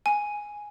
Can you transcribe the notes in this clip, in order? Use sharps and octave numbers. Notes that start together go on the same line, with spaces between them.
G#5